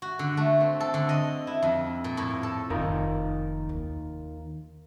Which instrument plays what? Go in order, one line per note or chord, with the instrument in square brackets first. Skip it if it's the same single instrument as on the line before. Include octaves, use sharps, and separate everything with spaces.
[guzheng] F#4
D3
A3
C4
A4
D3
D#5
E4
F2
A#2
A2
A4
[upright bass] F1 [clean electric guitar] D#3 F4 A#4
[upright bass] D#2